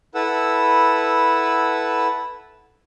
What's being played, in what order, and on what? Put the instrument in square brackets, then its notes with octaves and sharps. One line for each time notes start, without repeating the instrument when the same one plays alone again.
[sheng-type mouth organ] E4 A4 B4 F#5 E6